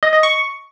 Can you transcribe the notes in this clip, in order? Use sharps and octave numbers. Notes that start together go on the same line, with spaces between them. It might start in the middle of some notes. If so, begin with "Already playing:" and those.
D#5
D#5
C#6